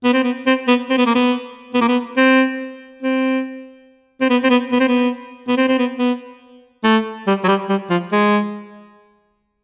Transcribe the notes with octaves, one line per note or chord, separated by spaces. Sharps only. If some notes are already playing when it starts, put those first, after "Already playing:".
B3
C4
B3
C4
B3
C4
B3
A#3
B3
B3
A#3
B3
C4
C4
C4
B3
C4
B3
B3
C4
B3
B3
C4
C4
B3
B3
A3
G3
F#3
G3
G3
F3
G#3